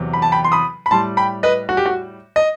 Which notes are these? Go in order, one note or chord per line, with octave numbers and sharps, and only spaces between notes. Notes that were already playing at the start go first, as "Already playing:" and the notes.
Already playing: E2 C3 F#3
B5
A5
G5 B5
C6
B5 D#6
B5
A2 G3 A5 C6
G5 B5
B4 D#5
F#4
G4
F#4
D#5